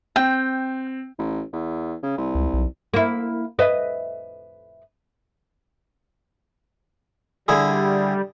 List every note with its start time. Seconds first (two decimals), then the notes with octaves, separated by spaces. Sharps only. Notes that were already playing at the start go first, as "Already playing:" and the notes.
0.16 C4 G5
1.19 A1
1.53 E2
2.03 C#3
2.18 C2
2.35 C#2
2.54 B1
2.94 A#3 E4
3.59 B4 D#5 E5
7.48 D3 G3 E4 G#4